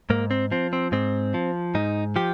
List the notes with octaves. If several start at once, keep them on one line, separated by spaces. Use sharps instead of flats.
G#2 A#3
C4
F3 C4
C4
G#2 C4
F3
G#2 D#4
F3 G4